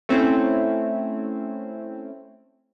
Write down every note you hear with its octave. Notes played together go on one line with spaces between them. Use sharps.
A3 C4 C#4 E4